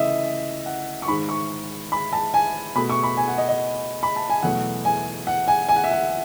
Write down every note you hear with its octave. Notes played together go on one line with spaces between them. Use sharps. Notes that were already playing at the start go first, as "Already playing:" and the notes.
Already playing: C#3 E3 A3 D#5 E5
F#5
C#6
G#2 D#3 G#3 B5
C#6
B5
A5
G#5
B2 A3 B5
C#6
B5
G#5
F#5
D#5
D#5
B5
A5
G#5
E2 B2 F#3 A3 F#5
G#5
F#5
G#5
G#5
F#5
E5
F#5